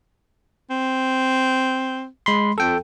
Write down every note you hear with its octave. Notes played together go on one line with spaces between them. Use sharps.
C4
G#3 B5 C6
F2 A4 G5